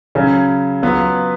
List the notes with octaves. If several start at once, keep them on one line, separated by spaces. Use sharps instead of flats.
C#3 F#3 C#4
F#3 B3 F4 B4